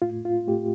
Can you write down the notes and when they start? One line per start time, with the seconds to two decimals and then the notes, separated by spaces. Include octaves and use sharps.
0.02 A2 A3 F4
0.25 F4
0.47 A2 A3 G4